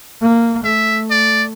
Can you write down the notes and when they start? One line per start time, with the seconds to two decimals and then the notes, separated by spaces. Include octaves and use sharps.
0.21 A#3
0.64 A3 E5
1.10 D5